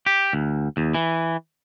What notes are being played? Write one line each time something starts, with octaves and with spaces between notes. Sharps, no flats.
G4
D2
D#2
E3